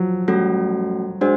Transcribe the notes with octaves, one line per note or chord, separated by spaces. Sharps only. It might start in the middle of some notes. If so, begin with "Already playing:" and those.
Already playing: F3 F#3
G3 A3 C#4 F#4 A4
G#3 D4 F#4 C5